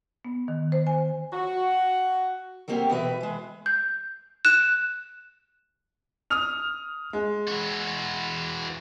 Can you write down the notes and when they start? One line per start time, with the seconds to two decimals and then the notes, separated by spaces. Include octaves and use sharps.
0.25 B3
0.48 D#3
0.72 C5
0.87 G#5
1.33 F#4
2.68 F#3 G3 A#3 C4 G4
2.90 B2 E3 B4 E5
3.21 E3 G#3
3.66 G6
4.45 F#6 E7
6.30 D#6 F6 F7
7.13 G#3
7.48 E3 F#4